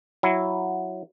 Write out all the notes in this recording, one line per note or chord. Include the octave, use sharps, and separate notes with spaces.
F#3 E4